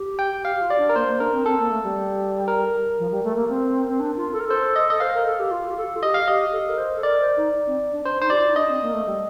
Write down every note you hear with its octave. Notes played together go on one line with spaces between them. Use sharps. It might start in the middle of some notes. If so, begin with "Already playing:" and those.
Already playing: G4
G5
G4 F5
G4
F4
D5
D4
A#4
A#3 C5
A#3
D4 A#4
C4
C4 A4
A#3
A3
G3
A#4
F3
G3
A3
A#3
C4
C4
D4
F4
A4
A#4
A4 C5
D#5
D#5
C5 F5
A#4
A4
G4
F4
G4
A4
F4
G4 D#5
F5
G4 D#5
A4
A#4
C5
A4
A#4 D5
C5
D#4
C4
D4
D4 C5
D#4 C5
G4 D5
F4
D#4
D4 D#5
C4
A#3
A3
G3